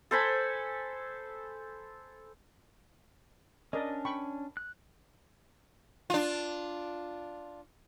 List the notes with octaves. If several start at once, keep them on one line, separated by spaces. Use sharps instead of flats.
A4 C5 G#5 B5
C#4 D4 A#4 D5 D#5
G5 B5 C#6
F#6
D4 F4